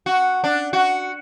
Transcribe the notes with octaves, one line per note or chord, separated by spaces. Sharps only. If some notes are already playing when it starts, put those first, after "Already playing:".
F#4
D4
F#4